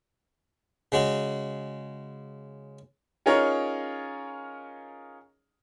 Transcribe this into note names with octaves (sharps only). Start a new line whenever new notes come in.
C#3 G#3 F#4
C#4 D#4 F4 G#4 A#4 C#5